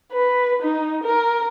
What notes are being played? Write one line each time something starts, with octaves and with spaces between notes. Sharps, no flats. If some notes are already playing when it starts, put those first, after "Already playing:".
B4
D#4
A#4